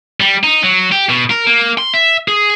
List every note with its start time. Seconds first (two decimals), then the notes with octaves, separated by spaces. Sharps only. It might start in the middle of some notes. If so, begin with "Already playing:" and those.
0.20 G3
0.43 D#4
0.63 F#3
0.92 G4
1.09 B2
1.30 A#4
1.47 A#3
1.78 C6
1.94 E5
2.28 G#4